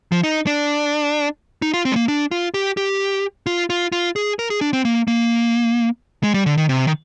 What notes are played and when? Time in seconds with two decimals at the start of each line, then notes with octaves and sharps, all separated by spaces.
0.12 F3
0.23 D#4
0.47 D4
1.62 D#4
1.74 F4
1.85 C4
1.92 G#3
1.96 A#3
2.08 D4
2.31 F4
2.54 G4
2.77 G4
3.46 F4
3.70 F4
3.92 F4
4.16 G#4
4.39 A#4
4.50 G#4
4.61 D4
4.73 C4
4.85 A#3
5.08 A#3
6.23 G#3
6.34 G3
6.46 D3
6.57 D#3
6.69 C3
6.87 D#3